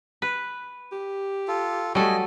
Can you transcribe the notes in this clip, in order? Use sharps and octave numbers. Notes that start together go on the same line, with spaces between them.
B4
G4
F4 A4
F#3 G3 A3 A4 D#5 G#5